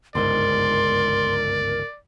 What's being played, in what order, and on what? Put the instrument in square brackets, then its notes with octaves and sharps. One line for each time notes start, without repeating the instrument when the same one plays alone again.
[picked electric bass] G1 C#2 G#2 [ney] A#4 [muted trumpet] D5 [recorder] C6